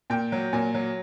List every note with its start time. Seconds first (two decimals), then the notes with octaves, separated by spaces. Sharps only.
0.10 A#2 G5
0.32 F#3
0.53 A#2 G#5
0.74 F#3